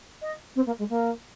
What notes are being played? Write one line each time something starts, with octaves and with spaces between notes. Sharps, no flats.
D#5
C4
A#3
G#3
A#3